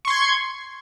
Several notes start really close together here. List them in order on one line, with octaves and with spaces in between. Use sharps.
C#6 C6 G#6